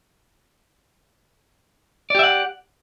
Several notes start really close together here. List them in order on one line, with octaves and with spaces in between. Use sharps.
D5 G4 E5 F#5